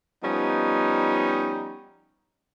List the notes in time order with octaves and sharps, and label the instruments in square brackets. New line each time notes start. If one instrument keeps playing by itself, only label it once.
[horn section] F3 G3 B3 C#4 D#4